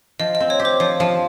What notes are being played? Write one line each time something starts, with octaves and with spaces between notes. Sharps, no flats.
F3 D#5
D#5
C4
C#5
G4
C5
F3 C#5
F3